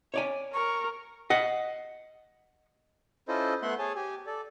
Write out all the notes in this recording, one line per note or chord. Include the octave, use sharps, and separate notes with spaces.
C#5 D5 G#5
A#4 C#6
D#5 F#5
C#4 E4 F4 A4 C5 D#5
A3 B3 E5 F#5 C6 F#6
G#4 C#5 G#5 A5
G4 G#5
A4 D5